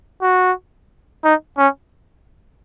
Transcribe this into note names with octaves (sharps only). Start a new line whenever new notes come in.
F#4
D#4
C#4